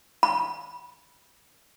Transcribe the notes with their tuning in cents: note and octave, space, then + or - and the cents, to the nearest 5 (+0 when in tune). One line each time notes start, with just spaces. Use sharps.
B5 -25